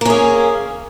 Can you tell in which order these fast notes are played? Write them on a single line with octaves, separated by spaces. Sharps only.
A#3 C#4 G#4